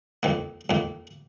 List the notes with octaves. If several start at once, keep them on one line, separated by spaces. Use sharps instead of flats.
F2 D#3 A#3
F2 D#3 A#3